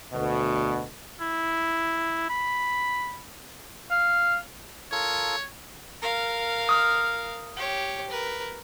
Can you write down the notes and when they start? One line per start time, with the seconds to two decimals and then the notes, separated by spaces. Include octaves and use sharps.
0.14 D2 B2
1.21 E4
2.29 B5
3.91 F5
4.92 F4 A4 A#4 C#5
6.02 A#4 F5
6.69 D#6 F6
7.57 G4 C#5
8.10 A#4 B4